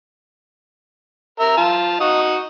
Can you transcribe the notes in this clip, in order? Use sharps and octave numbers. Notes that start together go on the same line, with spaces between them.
A#4 E5
F4 A5
D#4 F#4 D#6